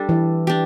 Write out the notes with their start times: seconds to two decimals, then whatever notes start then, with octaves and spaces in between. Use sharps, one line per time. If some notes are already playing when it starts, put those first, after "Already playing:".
Already playing: G3 D4 A4
0.09 E3
0.47 D4 G4